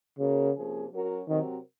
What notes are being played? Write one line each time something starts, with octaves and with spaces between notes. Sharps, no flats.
C#3 A#3 C#4 F#4 A#4
C3 F3 A#3 C#4 G#4
F#3 C#4 F#4 A#4
C3 D#3 F#3 C4 F#4 A#4